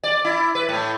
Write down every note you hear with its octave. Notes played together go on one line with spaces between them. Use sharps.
D5
E4
B4
A2